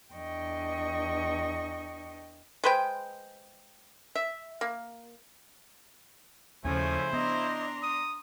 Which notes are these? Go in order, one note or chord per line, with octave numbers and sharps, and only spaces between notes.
E2 D4 D#5 G5 C#6
G#3 B4 C5 G5
E5
A#3
D#2 C#3 F3 A3 C#4 E4 C5 G#5
B3 D4 D#5 A#5 C6
D#6